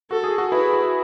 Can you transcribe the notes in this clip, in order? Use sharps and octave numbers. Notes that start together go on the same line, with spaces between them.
F#4 A4
G#4
F#4
E4 B4
F#4